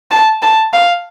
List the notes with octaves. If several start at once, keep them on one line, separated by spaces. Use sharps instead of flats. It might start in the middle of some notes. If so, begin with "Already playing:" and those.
A5
A5
F5